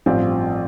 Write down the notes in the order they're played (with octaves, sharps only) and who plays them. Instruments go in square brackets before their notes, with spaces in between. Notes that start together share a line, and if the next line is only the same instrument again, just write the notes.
[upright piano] A1 G2 F3 C4 F4